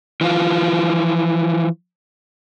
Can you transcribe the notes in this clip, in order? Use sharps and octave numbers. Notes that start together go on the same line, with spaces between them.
E3 F3 F4